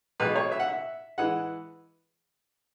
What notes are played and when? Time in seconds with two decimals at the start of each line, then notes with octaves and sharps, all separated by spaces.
0.20 B1 B2 G#3 B4
0.36 C#5
0.52 E5
0.59 F#5
0.68 E5
1.18 E3 G#3 F#5